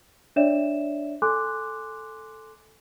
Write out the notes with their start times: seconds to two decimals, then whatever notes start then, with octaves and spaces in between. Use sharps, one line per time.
0.36 D4 C#5 D5 E5 E7
1.22 A4 G#5 C6 D6 F#6